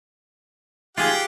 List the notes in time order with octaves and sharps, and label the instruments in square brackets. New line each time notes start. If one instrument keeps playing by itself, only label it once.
[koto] F4 G#4 [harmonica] G4 F#5 G5